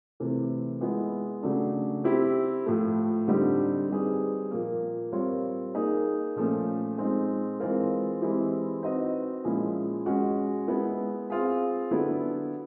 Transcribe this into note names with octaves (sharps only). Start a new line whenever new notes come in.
C3 E3 A3
G#3 B3 E4
C#3 F#3 A3 D4
C4 E4 G4
A2 F3 A3
D3 G3 C4 D#4 G4
G3 C4 D#4 G#4 B4
A#2 F3 A#3
G3 C4 F4 A#4 C#5
A#3 D#4 G#4
A#2 F3 A3 C#4
G#3 C4 D#4
E3 G#3 C4 F4 A#4
E3 G#3 C4 E4 G4
C4 D#4 F#4 B4 D#5
A#2 F3 G#3 C#4 E4
G#3 C#4 F#4
G#3 B3 E4
C4 F4 G#4
D3 F#3 B3 E4 A4